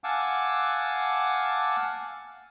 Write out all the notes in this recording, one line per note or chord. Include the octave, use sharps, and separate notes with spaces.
F5 F#5 G#5 A5 D6 E6